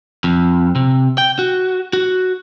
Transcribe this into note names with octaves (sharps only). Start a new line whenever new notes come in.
F2
C3
G5
F#4
F#4